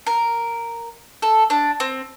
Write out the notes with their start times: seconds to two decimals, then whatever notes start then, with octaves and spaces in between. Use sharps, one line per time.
0.07 A#4
1.22 A4
1.50 D4
1.80 C4